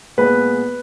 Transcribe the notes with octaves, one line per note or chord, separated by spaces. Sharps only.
A#2 G#3 B3 B4